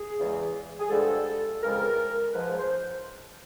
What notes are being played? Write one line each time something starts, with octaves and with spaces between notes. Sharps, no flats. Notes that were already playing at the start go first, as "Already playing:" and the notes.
Already playing: G#4
E2 C#3 E3 G#3
G#4
G2 D3 F3 G#3 A4
F2 C#3 E3 G#3 A#4
G#2 F3 G#3 B4
C#5
C5